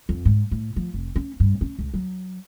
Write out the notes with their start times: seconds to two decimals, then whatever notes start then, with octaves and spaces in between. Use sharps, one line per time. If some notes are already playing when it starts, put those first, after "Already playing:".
0.09 F2
0.25 G#2
0.51 A2
0.76 F3
0.94 F1
1.16 C#4
1.40 G2
1.61 C#4
1.79 C#2
1.94 F#3